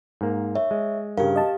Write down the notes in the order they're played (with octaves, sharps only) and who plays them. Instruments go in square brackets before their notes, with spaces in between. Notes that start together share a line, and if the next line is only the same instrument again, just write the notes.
[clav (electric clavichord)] G#2 A#3
[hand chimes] C#5 E5
[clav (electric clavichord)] G#3
[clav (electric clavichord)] G2 C#3 [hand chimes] G4 F5 [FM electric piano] A#4
[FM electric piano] D#5 A5